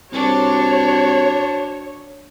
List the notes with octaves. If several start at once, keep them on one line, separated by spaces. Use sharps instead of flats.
C2 D4 F#4 C5 C#5